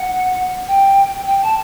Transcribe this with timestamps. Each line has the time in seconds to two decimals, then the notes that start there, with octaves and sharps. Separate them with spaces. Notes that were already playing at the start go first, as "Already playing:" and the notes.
Already playing: F#5
0.68 G5
1.27 G5
1.42 A5